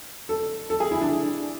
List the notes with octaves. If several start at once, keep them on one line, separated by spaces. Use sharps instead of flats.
A4
A4
G#4
E4
D4